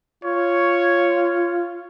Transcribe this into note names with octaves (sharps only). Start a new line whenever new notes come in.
F4 C#5